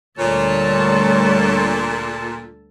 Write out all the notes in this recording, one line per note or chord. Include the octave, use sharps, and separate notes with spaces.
D2 A#2 G3 A4 C#5 A5